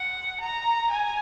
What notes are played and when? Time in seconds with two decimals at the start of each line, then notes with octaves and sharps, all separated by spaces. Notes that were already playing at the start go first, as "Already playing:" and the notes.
Already playing: F#5
0.40 A#5
0.91 G#5